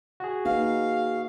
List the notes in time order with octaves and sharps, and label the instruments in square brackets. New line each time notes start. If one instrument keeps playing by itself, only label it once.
[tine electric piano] F#4 G#4
[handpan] A#3 D#4 B4 [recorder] F5